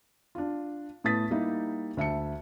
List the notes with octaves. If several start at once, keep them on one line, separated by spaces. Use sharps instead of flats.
D4 F4
A2 B3 A5 D#6 A6 B6
G3 A#3 D#4 E4 G4
D2 E5 A5 C#7